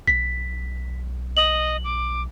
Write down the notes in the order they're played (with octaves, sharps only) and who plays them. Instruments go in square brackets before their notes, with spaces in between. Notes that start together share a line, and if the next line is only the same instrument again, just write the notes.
[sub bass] B1 [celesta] B6
[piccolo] D#5 [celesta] F#7
[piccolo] D6